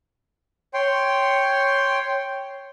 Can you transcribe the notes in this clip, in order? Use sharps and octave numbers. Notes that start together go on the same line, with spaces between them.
C#5 G5 C6